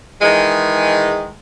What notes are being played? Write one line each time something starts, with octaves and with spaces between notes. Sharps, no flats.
D#3 E3 G#3